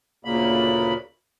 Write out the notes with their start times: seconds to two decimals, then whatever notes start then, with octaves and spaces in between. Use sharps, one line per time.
0.25 D2 A#2 C#3 A#3 B5